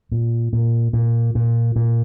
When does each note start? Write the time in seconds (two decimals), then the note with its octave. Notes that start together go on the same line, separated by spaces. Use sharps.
0.11 A#2
0.53 A#2
0.93 A#2
1.35 A#2
1.76 A#2